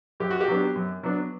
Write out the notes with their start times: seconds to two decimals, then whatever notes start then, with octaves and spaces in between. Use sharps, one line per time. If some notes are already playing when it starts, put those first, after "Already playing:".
0.20 F#2 G4
0.30 F#4
0.40 G4
0.48 F#3 B3 D4
0.75 F#2
1.03 F#3 B3 D4